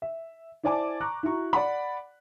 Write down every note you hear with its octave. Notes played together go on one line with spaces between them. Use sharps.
E5
E4 C5 D5 G#5 A5 D6
A#5 C#6 D6 F#6
E4 F#4 A#5 C#6
D5 F#5 B5